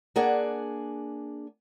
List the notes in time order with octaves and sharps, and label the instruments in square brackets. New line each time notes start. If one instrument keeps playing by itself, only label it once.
[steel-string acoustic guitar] A#3 D4 G#4 D5 F#5